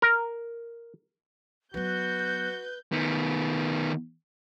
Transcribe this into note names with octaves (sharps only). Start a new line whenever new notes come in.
A#4
F#3 B3 F#4 B4 G6
D#3 B3